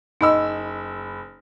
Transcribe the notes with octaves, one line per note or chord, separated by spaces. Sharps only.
F#1 D#4 D#5 B5 E6